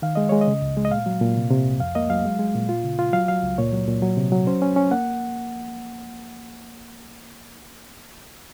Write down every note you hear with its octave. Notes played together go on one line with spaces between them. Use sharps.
D#3 F5
G#3 D#5
G#3 C#5
D#5
C#3
C#2
G#3
D#5
A#2 F5
F#3
A#2
C3
C3
C2
F2 F5
A#3 D#5
F#3 F5
G#3
G#3
A#2
F4
C#3
F4
F#3 F5
F#3 F5
C#2
A#2 C#5
F#3
A#2
F#3
C3
F#3
C#4 C5
C#4
C#4
A#3 F#5